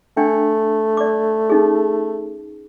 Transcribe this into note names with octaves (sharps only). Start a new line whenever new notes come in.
A3 D4 G5
D5 D6
C#4 D#4 G#4